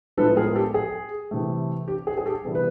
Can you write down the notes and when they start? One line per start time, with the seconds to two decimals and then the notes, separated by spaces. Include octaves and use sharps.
0.17 A2 F3 G#3 B3 A4 B4
0.36 G#4 A#4
0.55 G4 A4
0.74 G#4
1.31 C3 E3 A3
1.88 G4
2.07 G#4
2.18 G#4
2.26 G4 A4
2.45 C3 E3 G3 B3
2.55 B4